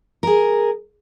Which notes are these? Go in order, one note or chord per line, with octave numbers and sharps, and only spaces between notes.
G#4 A#4